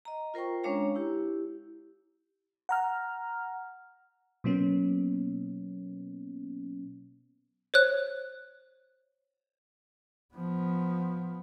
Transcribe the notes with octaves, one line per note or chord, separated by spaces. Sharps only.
D#5 A#5
F4 A#4 C5 G5 C#6
G#3 C#4 D4 C#5 F5 A#5
E4 G4
F#5 A#5 F6
B2 F#3 A#3 B3 C#4
C5 C#5 F#6
F3 B3